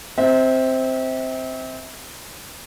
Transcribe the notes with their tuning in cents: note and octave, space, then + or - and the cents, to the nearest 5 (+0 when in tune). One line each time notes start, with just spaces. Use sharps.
C4 +0 E5 -35